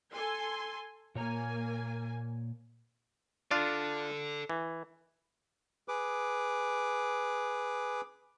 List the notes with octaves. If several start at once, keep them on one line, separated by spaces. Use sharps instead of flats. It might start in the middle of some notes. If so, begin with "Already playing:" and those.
A4 G#5 C6
A#2 A#3 C#5 G#5 A#5
D4 F4 A4 D5
E3
G#4 B4 D6